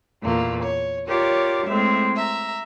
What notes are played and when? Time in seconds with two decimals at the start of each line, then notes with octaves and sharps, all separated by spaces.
0.22 E2 A#2 A3 A#3
0.63 C#5
1.08 F4 G4 A#4 C#5 D5
1.67 A2 G#3 C4 E5
2.16 E5 A#5